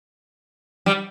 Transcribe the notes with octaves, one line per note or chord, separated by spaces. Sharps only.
G3